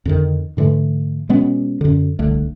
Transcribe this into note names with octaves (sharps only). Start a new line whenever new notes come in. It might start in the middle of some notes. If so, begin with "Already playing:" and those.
F2 D3 D#3
G#2 D3 E3 A3
B2 G#3 B3 C#4
F#2 D3
D1 C2 D3 A3